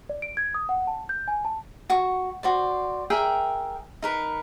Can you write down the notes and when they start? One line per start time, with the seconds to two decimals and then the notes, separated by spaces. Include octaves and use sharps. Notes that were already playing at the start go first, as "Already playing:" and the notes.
0.10 D5
0.22 D7
0.37 G#6
0.54 D#6
0.69 F#5
0.87 A5
1.09 G6
1.28 G#5
1.45 A5
1.90 F#4 C#6
2.43 F#4 C5 D5
3.10 G#4 A#4 E5 G5
4.02 D#4 A#4 B4